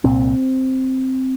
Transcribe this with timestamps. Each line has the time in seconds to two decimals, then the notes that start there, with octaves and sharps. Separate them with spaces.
0.04 C2 A#2 C4